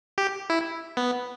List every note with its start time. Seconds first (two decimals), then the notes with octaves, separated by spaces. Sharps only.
0.18 G4
0.50 E4
0.97 B3